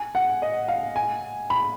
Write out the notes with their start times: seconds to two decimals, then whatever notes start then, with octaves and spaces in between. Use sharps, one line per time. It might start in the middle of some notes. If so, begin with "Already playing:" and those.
Already playing: G#5
0.15 F#5
0.42 D#5
0.68 F5
0.96 G#5
1.50 B5